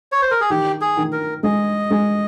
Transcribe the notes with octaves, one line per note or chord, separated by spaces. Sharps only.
C#5
C5
A#4
G#4
D#3 G4
G#4
D#3
A#4
G#3 D#5
G#3